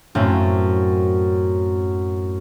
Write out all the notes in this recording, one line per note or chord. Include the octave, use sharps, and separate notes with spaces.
F#2 A2 A3 C4 C#4